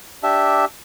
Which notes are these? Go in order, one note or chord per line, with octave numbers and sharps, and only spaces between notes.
D4 G4 E5